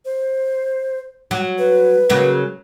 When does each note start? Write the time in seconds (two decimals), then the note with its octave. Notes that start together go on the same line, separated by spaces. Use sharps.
0.05 C5
1.31 F#3
1.58 B4
2.09 C#3 F#3 A#3